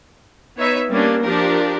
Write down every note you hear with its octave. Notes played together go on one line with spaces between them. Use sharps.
B3 D#4 B4 C#5 E5
G3 A#3 C#4 D4
F3 D4 G4 A#4